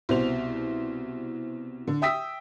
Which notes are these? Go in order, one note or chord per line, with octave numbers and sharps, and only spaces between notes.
C2 B2 F#4 C5 F7
D3
E5 G5 D#6 E6 B6